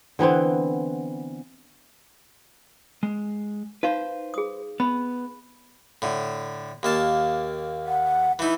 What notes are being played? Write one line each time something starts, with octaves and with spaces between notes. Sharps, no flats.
D3 E3 B3 C4
G#3
D#4 B4 C5 F5
G#4 D#6
B3 B5
A2 D3
D#2 A#3 A5
F#5
E3 D#4 E4